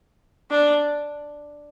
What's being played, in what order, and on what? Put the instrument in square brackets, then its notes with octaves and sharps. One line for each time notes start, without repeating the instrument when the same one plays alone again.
[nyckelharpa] D4